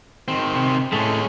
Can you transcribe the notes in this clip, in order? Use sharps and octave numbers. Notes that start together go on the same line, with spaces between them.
D#3 C4
C3
A2 G#3 A3 C#4